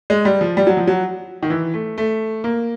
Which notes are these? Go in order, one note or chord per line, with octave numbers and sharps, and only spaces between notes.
G#3
G3
F3
G3
F#3
F3
F#3
D#3
E3
A3
A3
A#3